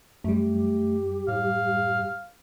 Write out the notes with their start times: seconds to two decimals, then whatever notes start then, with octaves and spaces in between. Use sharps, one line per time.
0.24 F#2 G3 A3 G4
1.28 A2 F5